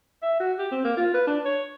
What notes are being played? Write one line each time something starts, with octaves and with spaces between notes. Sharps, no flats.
E5
F#4
G4
C4
A#3
F4
B4
D4
C#5